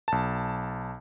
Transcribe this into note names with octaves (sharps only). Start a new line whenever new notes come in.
B1 A5